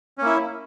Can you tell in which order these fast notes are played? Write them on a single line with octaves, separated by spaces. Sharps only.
C#4 A#3 E4